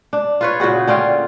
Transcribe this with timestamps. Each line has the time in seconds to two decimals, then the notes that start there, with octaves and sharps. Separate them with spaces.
0.13 D4
0.41 F4 B4 C#5
0.60 A#2 C#3 F#4 G#4
0.87 D3 C#4 F4 G5